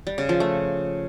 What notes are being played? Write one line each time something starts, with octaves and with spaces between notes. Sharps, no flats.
G3
C#3
F3
A3